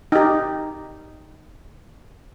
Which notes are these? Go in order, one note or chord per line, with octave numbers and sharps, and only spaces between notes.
D#4 G4